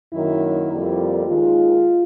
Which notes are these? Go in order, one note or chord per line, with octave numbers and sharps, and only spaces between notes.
F#2 D#3 F#3 A#3 E4
F2 D3 G3 A#3
D#2 D#3 G#3 F4